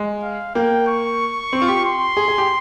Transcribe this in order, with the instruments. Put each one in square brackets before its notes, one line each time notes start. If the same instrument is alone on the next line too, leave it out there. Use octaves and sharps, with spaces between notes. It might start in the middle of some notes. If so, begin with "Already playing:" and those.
Already playing: [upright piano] G#3
[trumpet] F5
[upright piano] A#3 [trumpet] G5
[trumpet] C#6
[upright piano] C4
F4
G4
[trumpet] C6
[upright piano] G#4
G#4
G4